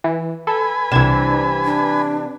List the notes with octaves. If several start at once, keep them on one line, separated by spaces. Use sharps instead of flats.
E3
A4 B4 G#5 B5
C2 C3 E3 D4 G#6 E7
D4